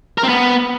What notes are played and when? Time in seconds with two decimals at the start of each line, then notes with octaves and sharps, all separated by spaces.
0.18 A#4
0.23 C4
0.29 B3